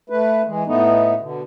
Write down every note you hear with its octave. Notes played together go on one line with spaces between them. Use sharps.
A3 B4
E3 G#3
A2 A3 B3 D#4
B2 D3